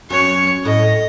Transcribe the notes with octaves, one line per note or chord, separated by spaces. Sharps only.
F#2 C#5
A2 D#5